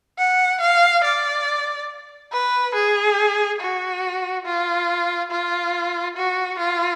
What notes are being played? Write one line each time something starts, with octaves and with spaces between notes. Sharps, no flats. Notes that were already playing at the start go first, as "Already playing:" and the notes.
F#5
F5
D5
B4
G#4
F#4
F4
F4
F#4
F4